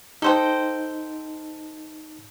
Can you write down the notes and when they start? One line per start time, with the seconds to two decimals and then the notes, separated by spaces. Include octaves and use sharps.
0.22 D#4 A4 C5 D#5 G5